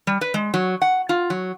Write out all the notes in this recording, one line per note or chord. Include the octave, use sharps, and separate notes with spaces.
G3
B4
G#3
F#3
F#5
F4
F#3